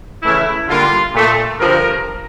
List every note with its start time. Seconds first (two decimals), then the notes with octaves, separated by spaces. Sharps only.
0.23 C#3 E3 A3 E4
0.68 D3 G3 A#3 F4
1.14 A#2 A3
1.59 G2 D3 F3 A#4